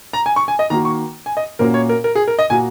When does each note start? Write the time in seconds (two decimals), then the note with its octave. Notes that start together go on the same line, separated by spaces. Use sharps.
0.13 A#5
0.26 G#5
0.36 C#6
0.48 G#5
0.59 D#5
0.70 D#3 A#3 F#4 A#5
0.85 C#6
1.26 G#5
1.37 D#5
1.59 A#2 A#3 C#4 F#4 A#4
1.74 C#5
1.89 A#4
2.04 A#4
2.15 G#4
2.28 A#4
2.39 D#5
2.50 A#2 A#3 F#4 G#5